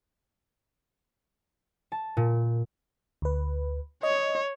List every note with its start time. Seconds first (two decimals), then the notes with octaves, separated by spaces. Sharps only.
1.92 A5
2.17 A#2
3.22 D2 B4
4.03 C#5 D#5